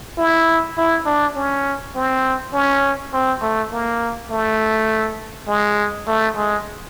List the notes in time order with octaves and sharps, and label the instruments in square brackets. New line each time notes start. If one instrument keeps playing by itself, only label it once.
[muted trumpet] E4
E4
D4
C#4
C4
C#4
C4
A3
A#3
A3
G#3
A3
G#3